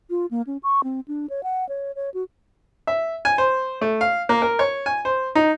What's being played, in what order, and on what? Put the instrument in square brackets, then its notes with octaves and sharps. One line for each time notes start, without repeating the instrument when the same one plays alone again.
[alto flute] F4
A#3
C#4
C#6
C4
D4
C#5
F#5
C#5
C#5
F#4
[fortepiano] E5
G#5
C5
A3
F5
A#3
A#4
C#5
G#5
C5
D#4